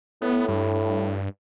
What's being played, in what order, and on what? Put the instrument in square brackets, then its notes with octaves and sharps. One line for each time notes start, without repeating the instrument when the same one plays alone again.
[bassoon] A2 [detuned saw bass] B3
[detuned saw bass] G2